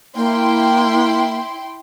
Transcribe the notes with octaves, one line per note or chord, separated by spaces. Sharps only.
A#3 E4 G5 C6